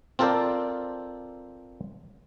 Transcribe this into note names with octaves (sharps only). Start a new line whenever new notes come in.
C4 F4 A4 A#4 C5 D5